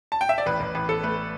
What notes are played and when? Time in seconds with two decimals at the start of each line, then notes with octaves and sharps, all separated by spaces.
0.12 A5
0.21 G5
0.29 E5
0.38 D5
0.46 A1 B4
0.60 A1
0.75 A1 B4
0.89 A1 A4
1.03 A3 B4